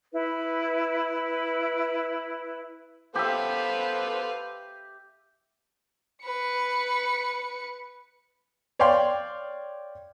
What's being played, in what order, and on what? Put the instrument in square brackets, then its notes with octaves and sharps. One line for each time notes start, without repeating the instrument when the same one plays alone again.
[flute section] E4 B4
[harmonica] B3 A4 C5 [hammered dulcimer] G4 E5 [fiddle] B4 F5
[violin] B4 C#7
[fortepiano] C#5 D5 F5 G5 C6